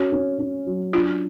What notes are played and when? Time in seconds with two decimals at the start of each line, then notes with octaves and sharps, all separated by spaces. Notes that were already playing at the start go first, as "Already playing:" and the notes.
Already playing: C#4 F#4
0.12 C#4
0.39 C#4
0.66 F#3
0.93 D4 F4